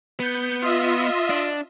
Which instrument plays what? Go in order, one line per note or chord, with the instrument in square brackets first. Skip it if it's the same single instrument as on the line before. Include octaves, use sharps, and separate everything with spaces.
[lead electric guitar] B3 [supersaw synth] G6 C#7
[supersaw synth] F4 D#5 E5
[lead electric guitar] D4